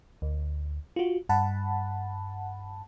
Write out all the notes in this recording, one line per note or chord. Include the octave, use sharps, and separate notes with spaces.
D2
F4 F#4
G2 F#5 A5 B5